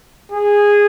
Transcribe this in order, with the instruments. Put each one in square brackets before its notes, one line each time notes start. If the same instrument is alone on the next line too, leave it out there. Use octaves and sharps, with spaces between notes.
[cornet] G#4